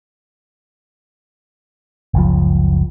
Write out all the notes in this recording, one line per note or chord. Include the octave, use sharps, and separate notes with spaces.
F#1 C#2 F3